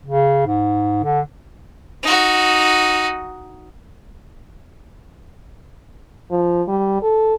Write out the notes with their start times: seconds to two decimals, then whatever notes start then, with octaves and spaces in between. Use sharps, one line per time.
0.06 C#3
0.47 G#2
1.04 D3
2.03 D#4 F#4
6.31 F3
6.68 G3
7.02 A4